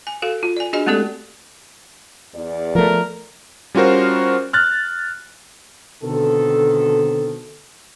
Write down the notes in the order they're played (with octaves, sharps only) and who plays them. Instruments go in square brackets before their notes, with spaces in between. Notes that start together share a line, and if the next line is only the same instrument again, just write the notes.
[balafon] G#5
F#4 A4 F5
F4
D5 G#5
D4 F#4 G#4 D#5 G#5
G#3 A3 C4 G4 A4 D5
[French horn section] E2 D5
[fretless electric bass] F3 A3 [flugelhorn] A#4
[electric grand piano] G3 C#4 F4 F#4 A#4 C5
F6 F#6 A6
[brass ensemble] B2 D3 D#3 C4 A4